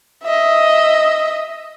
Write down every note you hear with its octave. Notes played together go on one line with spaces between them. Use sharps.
D#5 E5